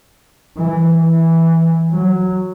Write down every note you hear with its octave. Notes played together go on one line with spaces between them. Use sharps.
E3
E3
F#3